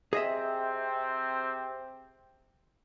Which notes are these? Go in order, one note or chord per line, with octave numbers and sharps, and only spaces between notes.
C3 C4 G#4 D#5 E5